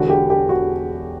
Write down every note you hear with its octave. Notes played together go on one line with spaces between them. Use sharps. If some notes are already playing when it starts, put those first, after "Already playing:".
Already playing: E1 E2 D3 F#4
G4
G4
F#4